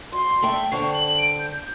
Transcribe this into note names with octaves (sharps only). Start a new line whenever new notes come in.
D2 C6
A3 E5 G5
D3 C5 G5 C#6
F#7
D7
G6